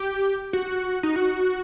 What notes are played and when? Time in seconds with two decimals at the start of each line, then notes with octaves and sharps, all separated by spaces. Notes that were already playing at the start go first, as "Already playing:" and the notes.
Already playing: G4
0.53 F#4
1.03 D#4
1.16 F#4